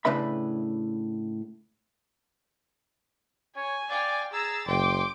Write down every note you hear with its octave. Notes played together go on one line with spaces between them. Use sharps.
A2 C#3 D4 B4 E5 B5
C#5 G#5
D5 F5 G5
G#4 A#5 E6 A6
F#1 G5 C6 D6